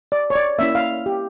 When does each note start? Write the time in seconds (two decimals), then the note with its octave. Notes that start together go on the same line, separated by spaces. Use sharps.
0.12 D5
0.30 C#5
0.35 D5
0.58 A#3 C#4 E4 E5
0.75 F5
1.06 G4